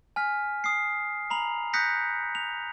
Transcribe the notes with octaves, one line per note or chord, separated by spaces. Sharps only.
G#5 F6 B6
D#6 C7
A#5 B5 F7
D#6 F#6 G6 A#6 B6 C#7
F7